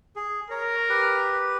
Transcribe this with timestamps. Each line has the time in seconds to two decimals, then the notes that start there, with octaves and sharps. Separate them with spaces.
0.16 G#4
0.50 A#4 C#5 A#5
0.89 G4 B4